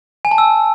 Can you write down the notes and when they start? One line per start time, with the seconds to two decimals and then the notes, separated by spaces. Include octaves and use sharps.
0.25 G#5
0.31 A5
0.38 E6